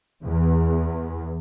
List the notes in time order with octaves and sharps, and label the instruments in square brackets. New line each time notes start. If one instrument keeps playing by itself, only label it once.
[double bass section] E2